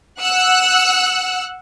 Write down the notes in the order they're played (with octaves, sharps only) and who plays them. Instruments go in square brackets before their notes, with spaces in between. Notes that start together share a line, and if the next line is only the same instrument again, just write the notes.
[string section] F#5 E6 F#6